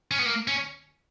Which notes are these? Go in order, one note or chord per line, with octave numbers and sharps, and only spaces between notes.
C#4
B3
A#3
C#4